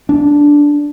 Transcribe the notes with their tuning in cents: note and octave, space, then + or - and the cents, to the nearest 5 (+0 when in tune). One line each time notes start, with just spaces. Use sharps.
D4 -5